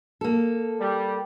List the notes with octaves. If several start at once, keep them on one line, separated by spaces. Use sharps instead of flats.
A#3 A4
G3